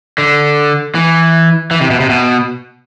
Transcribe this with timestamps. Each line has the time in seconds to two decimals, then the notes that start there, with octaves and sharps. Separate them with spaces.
0.18 D3
0.95 E3
1.71 E3
1.81 C3
1.90 B2
2.00 C3
2.09 B2